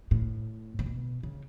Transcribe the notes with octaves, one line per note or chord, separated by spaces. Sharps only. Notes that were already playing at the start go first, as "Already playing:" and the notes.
A2
C#3
B2
C#3